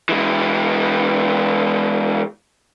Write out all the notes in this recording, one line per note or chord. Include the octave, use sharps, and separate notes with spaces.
E3 G#3